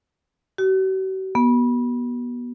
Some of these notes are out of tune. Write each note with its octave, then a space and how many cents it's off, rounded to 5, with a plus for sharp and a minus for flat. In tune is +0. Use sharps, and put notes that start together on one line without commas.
F#4 +45
B3 -25